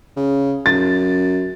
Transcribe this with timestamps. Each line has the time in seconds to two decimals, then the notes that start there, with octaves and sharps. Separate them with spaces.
0.17 C#3
0.66 F#2 A6